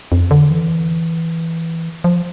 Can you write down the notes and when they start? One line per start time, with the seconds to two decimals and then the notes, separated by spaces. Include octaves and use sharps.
0.12 F2
0.31 D3
0.51 E3
2.04 F3